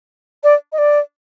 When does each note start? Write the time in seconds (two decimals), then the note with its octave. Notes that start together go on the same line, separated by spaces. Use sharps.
0.44 D5
0.72 D#5
0.78 D5